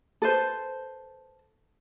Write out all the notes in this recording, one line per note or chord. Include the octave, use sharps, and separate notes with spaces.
A4 B4 C5